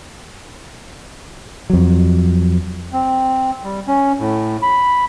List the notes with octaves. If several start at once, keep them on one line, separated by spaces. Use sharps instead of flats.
F2 F#3
C4
G3
C#4
A2
B5